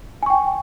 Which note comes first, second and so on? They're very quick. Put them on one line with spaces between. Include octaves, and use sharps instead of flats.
G#5 C#6 G5